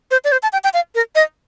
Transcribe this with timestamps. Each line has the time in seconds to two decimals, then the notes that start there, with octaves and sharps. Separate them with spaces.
0.11 C5
0.24 D5
0.32 C5
0.43 A5
0.53 G5
0.64 G5
0.74 F5
0.95 A#4
1.15 D#5